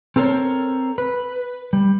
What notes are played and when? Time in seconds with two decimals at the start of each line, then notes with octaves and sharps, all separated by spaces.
0.16 C4 A4 A#4 C5 C#5
0.98 B4
1.73 G3